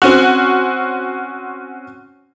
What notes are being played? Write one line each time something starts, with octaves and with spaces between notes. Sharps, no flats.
C4 C#4 F#4